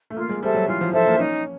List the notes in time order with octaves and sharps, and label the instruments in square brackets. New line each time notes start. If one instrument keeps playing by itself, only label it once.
[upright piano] A3
[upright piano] A#3 [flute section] F4
[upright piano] G#3
[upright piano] G3 [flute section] A4 C5 E5
[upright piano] F#3
[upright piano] E3 [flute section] F4
[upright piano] F3
[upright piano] F3 [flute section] A4 C5 E5
[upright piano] A#3
[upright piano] C#4 [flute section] D#4